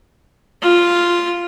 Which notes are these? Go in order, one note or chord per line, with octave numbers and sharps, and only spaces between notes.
F4